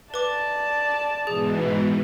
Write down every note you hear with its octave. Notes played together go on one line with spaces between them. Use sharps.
B4 D5 A5 D6
G#2 B2 E3 G#4